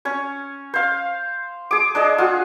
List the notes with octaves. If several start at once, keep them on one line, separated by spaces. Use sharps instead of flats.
C#4 C#5
C5 F5
G#4 D6
D4 G#4 D#5
F4 F#4